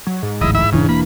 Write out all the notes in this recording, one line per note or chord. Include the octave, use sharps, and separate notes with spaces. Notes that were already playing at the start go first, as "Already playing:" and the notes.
F#3
G#2
D1 A1 E4 D#5
E4 E5
E1 C#3 E3 D4
A#3 B5